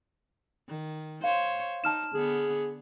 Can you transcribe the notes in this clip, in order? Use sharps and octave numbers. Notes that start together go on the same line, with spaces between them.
D#3
C5 C#5 F5
D#4 A5 F6 E7
D3 B3 G#4